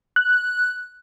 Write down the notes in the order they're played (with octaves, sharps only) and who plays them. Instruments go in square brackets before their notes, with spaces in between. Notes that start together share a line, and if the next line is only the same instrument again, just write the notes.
[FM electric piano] F#6